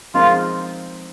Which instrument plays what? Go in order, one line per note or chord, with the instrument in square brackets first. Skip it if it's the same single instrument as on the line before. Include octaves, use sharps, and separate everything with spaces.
[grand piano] F3 G#3 C4 D#4 A#4 [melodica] F4